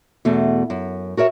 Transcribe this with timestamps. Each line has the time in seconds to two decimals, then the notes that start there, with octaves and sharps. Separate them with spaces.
0.25 E2 B2 A3
0.70 F#2
1.17 F#4 A#4 C#5 E5